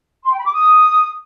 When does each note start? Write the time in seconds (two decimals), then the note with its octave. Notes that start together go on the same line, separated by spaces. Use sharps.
0.24 C6
0.31 G5
0.38 B5
0.45 D6
0.53 D#6